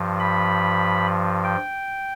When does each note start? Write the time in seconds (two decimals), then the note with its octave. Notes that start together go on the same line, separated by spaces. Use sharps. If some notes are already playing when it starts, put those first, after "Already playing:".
Already playing: G2 F3
0.20 B5
1.44 G5